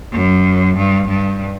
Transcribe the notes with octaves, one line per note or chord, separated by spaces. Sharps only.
F#2
G2
G2